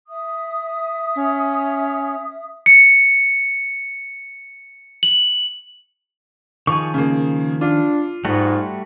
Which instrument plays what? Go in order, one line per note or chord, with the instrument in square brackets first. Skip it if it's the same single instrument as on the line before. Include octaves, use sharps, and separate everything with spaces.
[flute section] E5 D#6
[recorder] C#4
[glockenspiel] C#7
F#7
[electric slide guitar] D#3 F3 G#4 [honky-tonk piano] C#6
[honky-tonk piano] C#3 A#3
[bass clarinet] D4 [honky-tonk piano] F4
[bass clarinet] G#2 [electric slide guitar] G3 A3 F#4